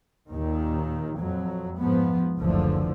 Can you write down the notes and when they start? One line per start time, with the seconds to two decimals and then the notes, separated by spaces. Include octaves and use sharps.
0.28 D#2 A#2 D#3
1.16 F2 F#3
1.77 G#2 F3 B3
2.38 F#1 D2 D3 E3 F3